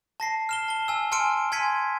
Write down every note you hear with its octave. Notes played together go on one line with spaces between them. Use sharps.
A5 A#6 C7
F6 E7 G7
A5 G7
G#5 E6
G#5 A5 C6 F6 C#7 D7
G#5 C6 G#6 B6 C#7 D#7